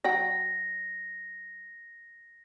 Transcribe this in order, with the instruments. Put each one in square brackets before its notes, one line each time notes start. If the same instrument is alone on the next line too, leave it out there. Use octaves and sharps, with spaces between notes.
[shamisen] F#3 F#5 G5 [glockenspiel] A#6